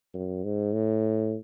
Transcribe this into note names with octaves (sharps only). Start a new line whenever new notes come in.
F#2
G#2
A2